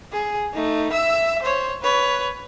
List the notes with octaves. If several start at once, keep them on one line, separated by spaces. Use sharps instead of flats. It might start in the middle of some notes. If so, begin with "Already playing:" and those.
G#4
A3 D#4
E5 E6
C5 C#5
B4 C#5